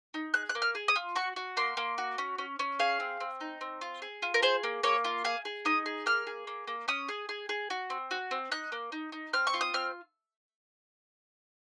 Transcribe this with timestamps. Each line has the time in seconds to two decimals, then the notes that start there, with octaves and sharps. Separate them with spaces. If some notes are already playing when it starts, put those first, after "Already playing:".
0.14 D#4
0.34 G#4 F#6
0.49 F#6
0.55 A#3
0.62 F6
0.75 G#4
0.88 D#6
0.96 F4
1.16 F#4 C#6
1.36 F#4
1.57 A#3 C6
1.77 A#3
1.98 F#4
2.18 C#4
2.38 C#4
2.59 C#4
2.79 G#4 F5
3.00 C4
3.20 C4
3.41 D#4
3.61 C4
3.81 F4
4.02 G#4
4.22 F4
4.34 A#4
4.42 G#4 C5
4.63 A#3
4.83 A#3 C#5
5.04 F4
5.24 G#4 F5
5.45 G#4
5.65 D#4 D#6
5.86 G#4
6.06 A#3 F6
6.27 G#4
6.47 A#3
6.67 A#3
6.88 C#4 D#6
7.09 G#4
7.29 G#4
7.49 G#4
7.70 F#4
7.90 C4
8.11 F#4
8.31 C4
8.51 D#4 F#6
8.72 A#3
8.92 D#4
9.12 D#4
9.33 C4 F6
9.47 C#6
9.54 F4
9.61 D#6
9.74 C4 F6